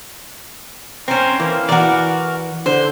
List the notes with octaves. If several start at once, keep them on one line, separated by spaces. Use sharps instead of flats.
C4 C#4 A#4 C5
E3 A#3
E3 F#4 A#4 D5
D3 C5